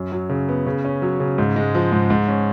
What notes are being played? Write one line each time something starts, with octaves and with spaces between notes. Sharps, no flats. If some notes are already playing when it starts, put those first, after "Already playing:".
Already playing: F#2
F#3
C#3
B3
C#3
C#4
F#3
C#3
G#2
G#3
F3
G#2
G#2
C#4